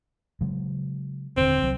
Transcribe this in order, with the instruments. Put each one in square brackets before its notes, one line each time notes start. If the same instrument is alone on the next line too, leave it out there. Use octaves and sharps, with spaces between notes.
[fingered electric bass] C#3 F#3 G#3
[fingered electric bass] D#1 D3 [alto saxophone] C4
[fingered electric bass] C2 F#3